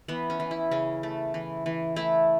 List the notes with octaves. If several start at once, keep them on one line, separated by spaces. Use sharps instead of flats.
E3 B3
C#4
E3
E4
C#3 C#4
A3
E3
E3
A3 E4